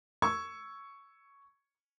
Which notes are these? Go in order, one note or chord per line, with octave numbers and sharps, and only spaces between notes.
C#6 E6 G#6